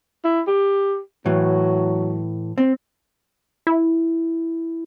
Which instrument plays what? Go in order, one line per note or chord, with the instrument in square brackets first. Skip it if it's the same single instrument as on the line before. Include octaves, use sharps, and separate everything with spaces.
[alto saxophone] E4
G4
[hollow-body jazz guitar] A2 E3 [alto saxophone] F#3
[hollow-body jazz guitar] C4
[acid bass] E4